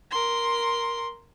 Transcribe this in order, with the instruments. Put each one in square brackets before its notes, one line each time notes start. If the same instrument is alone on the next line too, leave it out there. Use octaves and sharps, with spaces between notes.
[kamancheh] A#4 C6